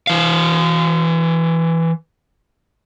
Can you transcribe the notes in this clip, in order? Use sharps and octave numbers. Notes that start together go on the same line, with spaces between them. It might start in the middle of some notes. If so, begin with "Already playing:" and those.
E3 F5